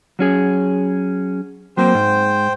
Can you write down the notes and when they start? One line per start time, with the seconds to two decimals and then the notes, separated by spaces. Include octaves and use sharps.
0.19 F#3 C#4 G#4
1.77 F#3 A#3 C4 C5 G5
1.94 G#2